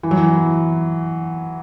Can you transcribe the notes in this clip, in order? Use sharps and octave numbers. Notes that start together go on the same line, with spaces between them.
E3
F#3
E3